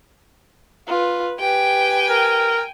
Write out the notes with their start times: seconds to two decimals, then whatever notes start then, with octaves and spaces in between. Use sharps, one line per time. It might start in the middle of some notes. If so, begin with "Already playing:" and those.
0.88 F4 B4
1.40 G4 B4 G5 G#5
2.10 A#4